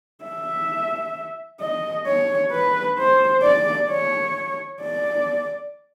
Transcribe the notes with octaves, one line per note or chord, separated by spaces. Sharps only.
E5
D#5
C#5
B4
C5
D5
C#5
D5